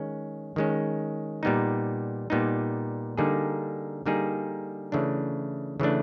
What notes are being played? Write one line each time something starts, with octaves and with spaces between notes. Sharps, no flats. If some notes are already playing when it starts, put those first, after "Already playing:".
Already playing: D#3 G#3 C#4
D#3 G#3 C#4
A#2 G3 B3 D#4
A#2 G3 B3 D#4
D3 G3 A#3 D#4 G#4
D3 G3 A#3 D#4 G#4
C#3 E3 A3 D4
C#3 E3 A3 D4